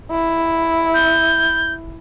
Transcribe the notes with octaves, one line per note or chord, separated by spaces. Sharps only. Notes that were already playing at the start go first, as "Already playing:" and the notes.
E4
G6